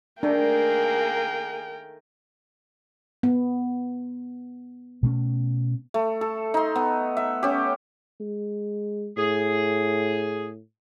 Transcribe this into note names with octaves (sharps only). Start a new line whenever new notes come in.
D#3 A3 A#3 D4 G#4 A#4 G5
B3
B2 A3 C#4
A3
A4
D#4 C6
B3
E5
C#4 G4
G#3
A2 G#4